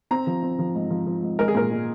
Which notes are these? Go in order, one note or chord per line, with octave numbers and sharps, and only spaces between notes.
C4 A#5
F3
C4
F3
G#2
F3
F3
G#2
G#3 A#4
G#4
A#2 A#4
G#3